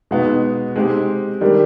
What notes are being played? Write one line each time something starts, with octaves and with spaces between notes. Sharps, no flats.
B2 G#3 B3 D#4
G#3 C4 D#4 G4
D#3 G3 A#3 D4 G4